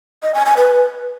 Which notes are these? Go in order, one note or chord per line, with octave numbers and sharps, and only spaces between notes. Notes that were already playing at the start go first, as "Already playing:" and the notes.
D#5
G#5
G#5
B4